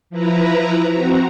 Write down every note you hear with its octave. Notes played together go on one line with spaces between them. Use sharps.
F3 E4 B4 A#5
C4 F#4 A#5